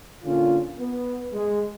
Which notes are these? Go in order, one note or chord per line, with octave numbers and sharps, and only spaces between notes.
A#2 D3 C#4 F4
B3
G#3